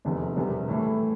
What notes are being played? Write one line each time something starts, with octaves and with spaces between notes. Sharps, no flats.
F1 E2 C3
E1 E2 C3 G3
A2 E3 A3